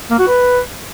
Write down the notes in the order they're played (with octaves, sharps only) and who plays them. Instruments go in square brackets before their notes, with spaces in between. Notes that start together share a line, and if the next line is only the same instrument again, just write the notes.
[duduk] A#3
F#4
B4